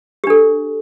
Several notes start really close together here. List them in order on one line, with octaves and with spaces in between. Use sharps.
G4 D4 A4